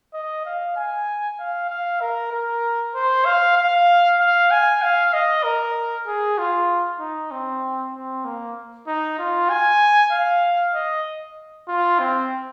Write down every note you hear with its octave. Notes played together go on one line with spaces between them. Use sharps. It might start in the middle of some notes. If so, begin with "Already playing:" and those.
D#5
F5
G#5
F5
F5
A#4
A#4
C5
F5
F5
F5
G#5
F5
D#5
A#4
G#4
F4
D#4
C4
C4
A#3
D#4
F4
G#5
F5
D#5
F4
C4